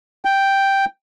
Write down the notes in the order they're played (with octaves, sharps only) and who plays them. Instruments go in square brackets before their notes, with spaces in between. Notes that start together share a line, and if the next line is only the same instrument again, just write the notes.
[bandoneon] G5